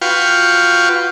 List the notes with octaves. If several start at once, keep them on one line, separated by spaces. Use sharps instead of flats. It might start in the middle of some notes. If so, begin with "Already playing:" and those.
F4 F#4 B4 F5 G5 C#6